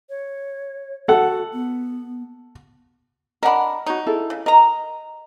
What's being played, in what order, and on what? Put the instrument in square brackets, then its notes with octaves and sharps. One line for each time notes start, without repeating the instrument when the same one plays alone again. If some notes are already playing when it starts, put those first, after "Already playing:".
[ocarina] C#5
[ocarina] F#4 [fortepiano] A4 F#5
[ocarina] B3
[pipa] D4 A#4 [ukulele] D#5 F#5 B5
[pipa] D#4 [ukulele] F#4 C#5
[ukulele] E4 G#4 A4
[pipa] C#3
[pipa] A#4 A#5 [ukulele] D#5